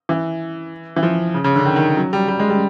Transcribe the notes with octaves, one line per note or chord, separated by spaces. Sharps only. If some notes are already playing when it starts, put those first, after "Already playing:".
E3
E3
F3
C#3
C#3
D3
D#3
D#3
F#3
G3
G3
G#3
G3